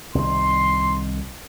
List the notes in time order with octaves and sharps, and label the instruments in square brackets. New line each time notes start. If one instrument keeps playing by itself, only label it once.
[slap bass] C2 D#3 [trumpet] C6